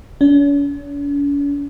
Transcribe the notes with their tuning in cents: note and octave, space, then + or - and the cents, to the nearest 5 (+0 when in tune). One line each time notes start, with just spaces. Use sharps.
C#4 +45